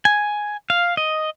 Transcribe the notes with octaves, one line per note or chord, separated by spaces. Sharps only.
G#5
F5
D#5